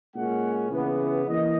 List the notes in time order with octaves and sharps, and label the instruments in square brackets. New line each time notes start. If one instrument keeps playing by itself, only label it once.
[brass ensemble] A#2 G#3 C#4 F#5
C#3 E3 B3
E3 A#3 D#5